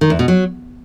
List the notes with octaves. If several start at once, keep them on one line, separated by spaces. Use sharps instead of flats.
D#3
E2
B2
F#3